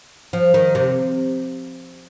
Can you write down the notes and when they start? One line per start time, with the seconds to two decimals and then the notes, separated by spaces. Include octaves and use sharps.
0.33 F3
0.54 D#3
0.75 C3